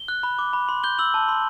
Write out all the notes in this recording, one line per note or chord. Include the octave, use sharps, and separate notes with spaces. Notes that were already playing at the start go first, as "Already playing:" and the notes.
Already playing: G7
F#6
B5
D6
B5
C6
G6 G7
E6 F#7
A5
C6